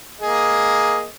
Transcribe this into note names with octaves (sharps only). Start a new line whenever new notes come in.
A#3 G#4 D#5